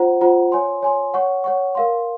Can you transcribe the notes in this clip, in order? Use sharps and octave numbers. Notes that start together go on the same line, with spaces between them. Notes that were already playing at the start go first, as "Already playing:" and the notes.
Already playing: F4 C5 F#5 A#5
F4 C5 F#5 A#5
C#5 G#5 C6
C#5 G#5 C6
C#5 F#5 C#6
C#5 F#5 C#6
A#4 F5 C6